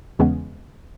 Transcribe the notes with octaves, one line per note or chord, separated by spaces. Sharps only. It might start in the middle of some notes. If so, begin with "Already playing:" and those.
E2 C#3 E3 G#3 B3 C#4